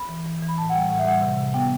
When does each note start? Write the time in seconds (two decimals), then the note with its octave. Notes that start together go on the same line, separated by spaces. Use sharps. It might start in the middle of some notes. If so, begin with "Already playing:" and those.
Already playing: B5
0.09 E3
0.26 E3
0.42 E3
0.48 B5
0.58 A2 A5
0.69 F#5
0.74 G3 G5
0.90 A2 F#5
0.99 E5
1.05 G3 F#5
1.22 C3
1.37 C3
1.54 B3 G5